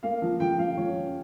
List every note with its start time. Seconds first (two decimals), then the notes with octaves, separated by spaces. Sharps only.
0.03 A#3 F5
0.22 F3
0.40 F3 G5
0.58 F3 F5
0.77 F3 C#5
0.95 C#4